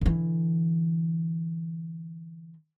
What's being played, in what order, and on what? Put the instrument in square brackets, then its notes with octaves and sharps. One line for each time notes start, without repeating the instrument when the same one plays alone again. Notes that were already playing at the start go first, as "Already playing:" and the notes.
[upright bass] D3 E3